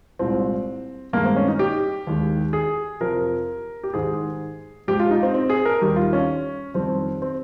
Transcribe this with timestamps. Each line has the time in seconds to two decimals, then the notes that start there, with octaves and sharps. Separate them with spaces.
0.19 C2 A#2 G#3 C4
1.13 G2 D#3 G#3 A#3
1.25 C4
1.36 C#4
1.48 D#4
1.59 G4
2.07 D#2 D#3 G#3
2.53 G#4
3.01 F2 C3 F3 A#4
3.83 G4
3.94 G#2 D#3 G#3 G#4
4.88 G#2 F3 G#3 G4
4.99 F4
5.11 D#4
5.23 C4
5.34 C4
5.50 G#4
5.65 A#4
5.81 D#2 D#3 G3 G4
5.96 F4
6.13 C#4
6.74 F2 D#3 G3 C4
7.22 C4